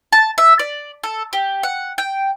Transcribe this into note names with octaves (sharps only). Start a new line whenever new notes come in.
A5
E5
D5
A4
G4
F#5
G5